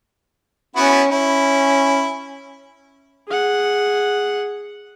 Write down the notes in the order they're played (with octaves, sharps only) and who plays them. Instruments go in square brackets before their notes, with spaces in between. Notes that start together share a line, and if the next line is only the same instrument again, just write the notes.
[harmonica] B3 E4 F#4 [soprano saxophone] C#4
[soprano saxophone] C#4 [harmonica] E4
[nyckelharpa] G#4 F#5